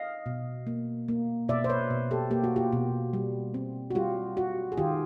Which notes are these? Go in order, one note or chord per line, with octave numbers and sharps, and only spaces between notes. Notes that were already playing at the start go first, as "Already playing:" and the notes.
Already playing: D#5 F5
B2
A#3
A#3
B2 D5 E5
C5
B4 C#5
B2
G4 A4
A#3 G4
F#4
F4 G4
B2
G3
C4
F#4
G3 F4 G4
F4 F#4
G#4
D#3 F4 G4